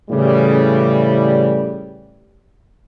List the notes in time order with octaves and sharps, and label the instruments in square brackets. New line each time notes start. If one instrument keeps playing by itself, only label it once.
[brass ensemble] A2 C#3 E3 G3